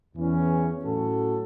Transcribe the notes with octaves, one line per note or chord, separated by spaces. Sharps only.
E2 E3 C#4
A2 F#3 C#4 F#4 A4